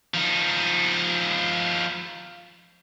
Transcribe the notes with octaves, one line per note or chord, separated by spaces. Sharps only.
F3 D#4